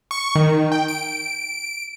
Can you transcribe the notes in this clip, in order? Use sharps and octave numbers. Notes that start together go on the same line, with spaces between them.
C#6
D#3
G5
D7